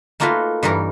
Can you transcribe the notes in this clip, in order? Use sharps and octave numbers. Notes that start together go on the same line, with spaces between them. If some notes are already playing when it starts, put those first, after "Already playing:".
A3 A#3 D#4 F4 F#4 B4
G2 E3 D#4 A#4